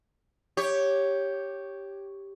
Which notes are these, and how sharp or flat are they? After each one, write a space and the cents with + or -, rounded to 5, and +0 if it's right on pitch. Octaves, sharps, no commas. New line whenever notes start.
G4 +0 C#5 +0